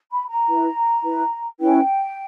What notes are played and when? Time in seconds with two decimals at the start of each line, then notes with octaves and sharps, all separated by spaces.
0.11 B5
0.29 A#5
0.48 E4 B4
1.04 E4 B4
1.59 C#4 E4 B4 G5